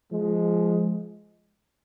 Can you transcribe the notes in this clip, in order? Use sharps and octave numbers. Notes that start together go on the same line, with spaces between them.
F3 G#3